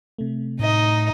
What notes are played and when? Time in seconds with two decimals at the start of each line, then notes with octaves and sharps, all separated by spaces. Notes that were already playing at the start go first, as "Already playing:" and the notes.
0.18 C3 A3
0.59 A2 D#4 D#5